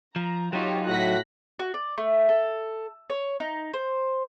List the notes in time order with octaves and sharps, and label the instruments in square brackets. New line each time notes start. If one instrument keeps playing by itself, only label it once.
[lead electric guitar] F3 [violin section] A#5
[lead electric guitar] F#3 D#4 [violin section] F4 G4 C#5
[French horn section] A2 F#4 [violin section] F#6 A#6 B6
[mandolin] F#4
D5
A3
A4
C#5
D#4
C5